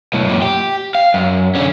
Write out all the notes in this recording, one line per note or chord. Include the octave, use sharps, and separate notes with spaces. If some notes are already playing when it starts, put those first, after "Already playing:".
B1 A2
F#2 A#2
G4
F5
F#2
D3 C#4